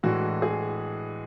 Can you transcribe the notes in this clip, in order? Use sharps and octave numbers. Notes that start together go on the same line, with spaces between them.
A2 E3 G#3 D4 F#4
G#4